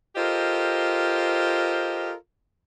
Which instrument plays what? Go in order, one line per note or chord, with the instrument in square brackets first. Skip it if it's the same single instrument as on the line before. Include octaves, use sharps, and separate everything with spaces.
[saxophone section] F4 G4 A4 A#4 C5 D#5